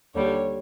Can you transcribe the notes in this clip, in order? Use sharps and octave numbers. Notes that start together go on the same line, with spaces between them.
D#2 D3 G3 C#5